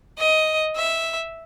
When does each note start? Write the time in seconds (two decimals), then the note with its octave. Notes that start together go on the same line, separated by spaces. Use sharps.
0.18 D#5
0.76 E5